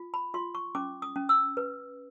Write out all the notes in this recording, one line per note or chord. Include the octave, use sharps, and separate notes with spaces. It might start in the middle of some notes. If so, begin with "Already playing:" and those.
Already playing: F4
B5
F4 C6
C#6
C#4 D6
D#6
C#4
E6
B4